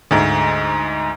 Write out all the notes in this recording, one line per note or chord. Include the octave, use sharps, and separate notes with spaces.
D2 G#2